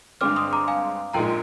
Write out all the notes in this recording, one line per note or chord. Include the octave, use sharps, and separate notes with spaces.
G2 D3 G#3 C4 D6 F6
C6 D#6
A#5 D6
F5 G#5
A#1 A#2 G#3 D#4 G5 A#5